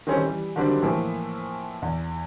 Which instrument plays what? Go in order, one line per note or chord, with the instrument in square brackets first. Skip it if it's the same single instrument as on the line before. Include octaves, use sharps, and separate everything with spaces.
[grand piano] D#3 E3 G3 C4 C#4 A4
E3 G3
D3 D#3 F#3 G3 C4 D4
A2 E3 F3 A#3
E2